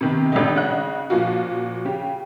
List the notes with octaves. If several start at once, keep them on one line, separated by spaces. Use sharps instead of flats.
C3 D#3 B3
G#1 G2 D3 A3 D#4
C#3 D#5 F#5 F#6
A#2 F3 F4 F#4
C#3 G4